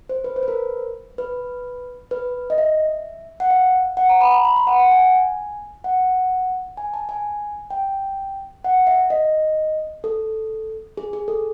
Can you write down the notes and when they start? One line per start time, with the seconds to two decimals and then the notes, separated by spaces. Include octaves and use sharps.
0.09 C5
0.24 B4
0.36 C5
0.43 B4
0.48 A#4
1.18 B4
2.11 B4
2.50 D#5
2.58 E5
3.40 F#5
3.51 F5
3.97 F#5
4.09 A#5
4.21 B5
4.32 A#5
4.45 B5
4.56 C6
4.67 F#5
4.79 F#5
4.91 G#5
5.84 F#5
6.77 G#5
6.94 A5
7.09 G#5
7.70 G5
8.64 F#5
8.87 E5
9.10 D#5
10.04 A4
10.97 G#4
11.13 G#4
11.28 A4